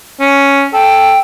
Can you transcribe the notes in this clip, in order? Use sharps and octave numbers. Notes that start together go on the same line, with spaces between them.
C#4
A4 G5